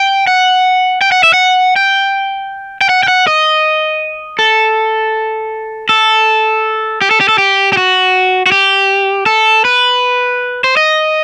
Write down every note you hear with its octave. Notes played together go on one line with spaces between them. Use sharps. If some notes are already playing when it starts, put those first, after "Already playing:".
Already playing: G5
F#5
G5
F#5
E5
F#5
G5
G5
F#5
G5
F#5
D#5
A4
A4
G4
A4
G4
A4
G4
G4
F#4
F#4
G4
A4
B4
C5
D#5